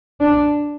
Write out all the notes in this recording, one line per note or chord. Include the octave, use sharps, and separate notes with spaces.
D4